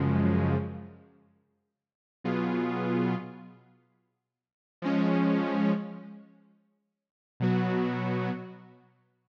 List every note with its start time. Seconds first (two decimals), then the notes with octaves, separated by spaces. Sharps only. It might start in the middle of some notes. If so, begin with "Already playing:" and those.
Already playing: F#2 C#3 F3 G#3
2.24 B2 F#3 B3 F4 G#4
4.82 F3 G#3 C#4
7.40 B2 F#3 B3 F#4